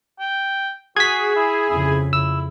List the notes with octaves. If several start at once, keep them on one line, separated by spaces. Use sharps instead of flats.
G5
F#4 G#4 G#6 B6
E4
F2 C#3 E4
E4 E6